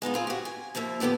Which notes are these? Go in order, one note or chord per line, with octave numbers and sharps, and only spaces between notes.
G#3 B3 D#4 F4
C4 F4 G#4
F#4 G4
G#5
D#2 F3 A#3 E5
D3 F3 B3 G4 A4